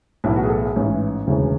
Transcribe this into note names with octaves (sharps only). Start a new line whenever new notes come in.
B1 A2 E3 E4
F#4
G#4
A4
G#4
A1 G#2 E3 C#4
E1 D2 C#3 E3